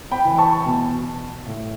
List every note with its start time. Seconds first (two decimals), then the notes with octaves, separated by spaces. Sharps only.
0.12 G5 B5
0.25 E3
0.38 A5 C#6
0.66 B2
1.46 A2